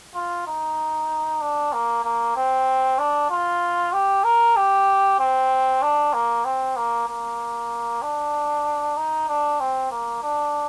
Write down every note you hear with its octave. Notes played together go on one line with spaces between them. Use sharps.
F4
D#4
D4
A#3
A#3
C4
D4
F4
G4
A#4
G4
C4
D4
A#3
C4
A#3
A#3
D4
D#4
D4
C4
A#3
D4